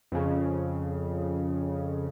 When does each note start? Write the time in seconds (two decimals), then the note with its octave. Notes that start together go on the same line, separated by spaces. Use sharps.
0.12 F2 C#3